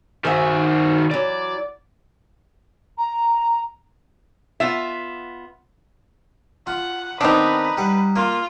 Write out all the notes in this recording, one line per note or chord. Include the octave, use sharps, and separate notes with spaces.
D#3 F#4 G#4 C5 E5
E3 F#3 D5
A#5
B3 F4 E5
F4 F#5
D#3 B3 C4 D4 D#4 B4
G3 F#5
A#3 F4